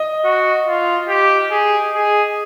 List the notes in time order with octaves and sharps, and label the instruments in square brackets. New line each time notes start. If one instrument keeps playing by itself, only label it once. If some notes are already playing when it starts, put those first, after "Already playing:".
Already playing: [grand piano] D#5
[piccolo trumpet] F#4
F4
G4
G#4
G#4